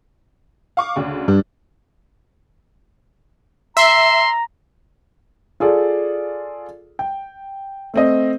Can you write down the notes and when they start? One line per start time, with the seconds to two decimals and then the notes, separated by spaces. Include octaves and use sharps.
0.77 F5 C#6 D6
0.96 D2 C#3 D4
1.28 G2 D4
3.77 E5 A#5 C6
5.60 F4 G#4 A4 D5
6.99 G5
7.94 A3 C4 D#5